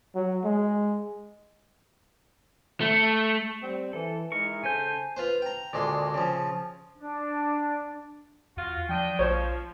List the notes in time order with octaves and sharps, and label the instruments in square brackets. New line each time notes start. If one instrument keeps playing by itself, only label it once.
[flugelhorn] F#3
G#3
[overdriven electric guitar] A3
[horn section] G3 C4
[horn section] E3 [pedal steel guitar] A4
[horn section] G#3 D#4 E4 [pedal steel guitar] A#4 C#6
[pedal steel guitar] C#3 G6 [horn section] A4 C5 G#5
[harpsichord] F4 B4 C5
G5 A#5
D2 A#2 G#3 C6
C#3 F3
[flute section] D4
[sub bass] E2 [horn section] F4 F#4
[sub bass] F3 [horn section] D4 D#5 G5
[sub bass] A#1 [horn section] F3 [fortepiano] C5 C#5